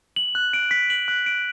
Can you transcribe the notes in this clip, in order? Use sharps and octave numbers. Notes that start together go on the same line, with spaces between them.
F#7
F#6
D7
B6
F#7
F#6
D7